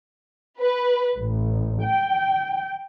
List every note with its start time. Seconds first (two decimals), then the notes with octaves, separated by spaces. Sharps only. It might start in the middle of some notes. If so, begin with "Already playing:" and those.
0.60 B4
1.17 A1
1.82 G5